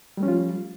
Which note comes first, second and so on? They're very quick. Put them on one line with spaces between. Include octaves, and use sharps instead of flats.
G3 A3 C#4 F3 F4